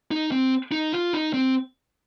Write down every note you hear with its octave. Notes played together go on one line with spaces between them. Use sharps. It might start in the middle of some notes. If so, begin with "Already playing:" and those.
D#4
C4
D#4
F4
D#4
C4